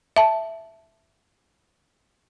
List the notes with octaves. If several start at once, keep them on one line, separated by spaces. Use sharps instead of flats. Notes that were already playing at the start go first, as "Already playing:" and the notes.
E5 A5